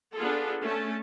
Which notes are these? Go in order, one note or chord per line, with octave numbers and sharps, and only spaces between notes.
B3 D4 F4 G#4 A4
A3 C#4 A5